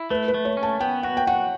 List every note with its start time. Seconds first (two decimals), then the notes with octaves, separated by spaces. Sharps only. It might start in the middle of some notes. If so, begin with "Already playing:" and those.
Already playing: E4
0.10 A3 B4
0.28 B4
0.34 A3
0.45 C#5
0.57 C#4
0.63 A5
0.80 B3 G5
1.03 F#4 F#5
1.17 G5
1.27 F#4 F#5